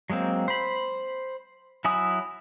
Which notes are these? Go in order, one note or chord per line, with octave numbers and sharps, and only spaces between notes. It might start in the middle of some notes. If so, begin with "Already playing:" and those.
F#3 G#3 A#3 C4
C5 B5
F#3 E4 G#5 D#6